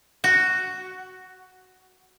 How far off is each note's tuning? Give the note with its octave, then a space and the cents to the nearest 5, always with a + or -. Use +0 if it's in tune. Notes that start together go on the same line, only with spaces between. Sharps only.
F#4 +5